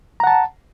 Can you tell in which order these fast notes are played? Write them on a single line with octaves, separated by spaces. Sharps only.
A#5 F#5 A5